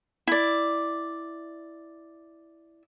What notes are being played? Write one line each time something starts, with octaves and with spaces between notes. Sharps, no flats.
E4 D5